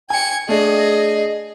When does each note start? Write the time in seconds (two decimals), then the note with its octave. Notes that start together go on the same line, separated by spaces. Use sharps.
0.10 G5 G#5 G#6 C#7
0.49 A3 D4 G#4 D#5